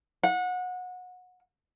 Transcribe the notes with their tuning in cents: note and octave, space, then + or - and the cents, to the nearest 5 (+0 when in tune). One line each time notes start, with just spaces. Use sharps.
F#5 -25